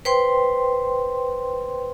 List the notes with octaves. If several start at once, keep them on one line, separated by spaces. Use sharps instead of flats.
B4 C5 G5 C6